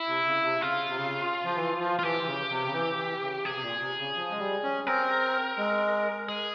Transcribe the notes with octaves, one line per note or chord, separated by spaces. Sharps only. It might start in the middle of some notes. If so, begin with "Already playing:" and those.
Already playing: E4
C3
C#3
C3
C#3 F4
C3
C#3
F3
E3
F3
F4
E3 G4
E3
C#3
C3
C#3
E3
E3
C#3
C3 G#4
C3
A#2
C3
C#3
F3
G#3
G3
C#4
C4 A#4
G#3
G#3 G#4